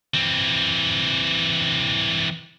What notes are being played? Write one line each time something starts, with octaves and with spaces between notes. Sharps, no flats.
E3 C4